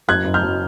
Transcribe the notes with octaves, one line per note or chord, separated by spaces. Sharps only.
F#1 F#6 G#6
F#1
F6 G6
F#3